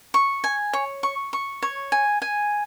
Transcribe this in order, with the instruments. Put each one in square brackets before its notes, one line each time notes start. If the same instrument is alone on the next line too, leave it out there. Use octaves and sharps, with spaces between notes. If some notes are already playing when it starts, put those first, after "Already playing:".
[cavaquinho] C#6
G#5
C#5
C#6
C#6
C#5
G#5
G#5